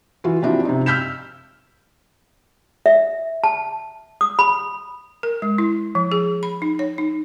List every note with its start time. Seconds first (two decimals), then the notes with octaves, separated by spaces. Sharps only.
0.24 E3 F4 F#4
0.42 F3 C4 D4 E4 F#4 G4
0.65 C3 D#4
0.86 E6 F6 G6 B6 E7
2.86 E5
3.44 A5
4.21 D#6
4.39 B5
5.23 A#4
5.42 G#3
5.58 E4
5.95 F3
6.12 G#4
6.43 B5
6.62 D#4
6.79 C#5
6.98 D#4